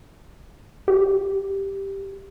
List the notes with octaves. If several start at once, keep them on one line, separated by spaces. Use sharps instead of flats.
G4